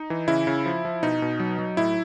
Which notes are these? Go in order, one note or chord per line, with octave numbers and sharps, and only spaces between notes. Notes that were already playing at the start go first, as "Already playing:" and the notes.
Already playing: D#4
E3
C#3 E4
C#3
F3
F3
B2 D#4
B2
F#3
F#3
A2 E4